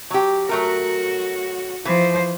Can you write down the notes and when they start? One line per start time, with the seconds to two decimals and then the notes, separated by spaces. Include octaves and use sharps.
0.10 F#3 G4
0.49 F#3 A3 F#4 A#4
1.85 E3 F3 C5